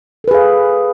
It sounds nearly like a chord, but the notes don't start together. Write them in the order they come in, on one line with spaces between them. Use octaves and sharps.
A4 B4 G#4 F5